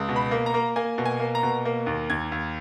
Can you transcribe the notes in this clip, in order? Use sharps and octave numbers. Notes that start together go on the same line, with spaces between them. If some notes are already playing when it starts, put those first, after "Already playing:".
Already playing: C#2
B2
B5
A#3
A#5
A#3
A#3 G#5
B2
G#5
A#3
A#5
B2
A#3
D#2
D#2 G#6
D#2